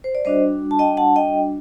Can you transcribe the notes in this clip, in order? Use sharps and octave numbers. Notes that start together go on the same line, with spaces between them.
C5
D5
G3 D4 F#4 C5 D#5
A5
D#5 G5
F#5 A5
D#5 G5